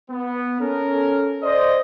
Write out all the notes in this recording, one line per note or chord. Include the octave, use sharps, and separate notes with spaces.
B3
C#4 A4 A#4
C5 D5 D#5